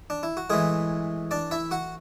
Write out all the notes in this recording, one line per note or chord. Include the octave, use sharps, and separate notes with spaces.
D4
E4
F#4
A2 E3 G#3 G#4
D4 D5
E4 E5
F#4 F#5